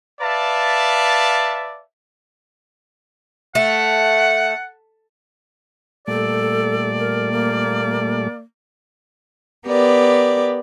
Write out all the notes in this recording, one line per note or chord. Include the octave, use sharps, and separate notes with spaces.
B4 D5 E5 F5 A5
A3 F#5
A#2 G3 A3 A4 D5
A#4
A#3
B3 G4 A#4 D5